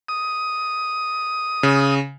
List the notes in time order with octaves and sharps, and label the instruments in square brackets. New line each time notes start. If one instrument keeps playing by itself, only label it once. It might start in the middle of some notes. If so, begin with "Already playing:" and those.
[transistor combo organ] D#6
[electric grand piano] C#3